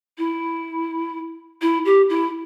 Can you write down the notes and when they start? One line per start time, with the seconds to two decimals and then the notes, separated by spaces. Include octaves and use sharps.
0.18 E4
1.62 E4
1.85 G4
2.09 E4